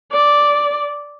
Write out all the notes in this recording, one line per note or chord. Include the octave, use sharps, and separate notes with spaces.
D5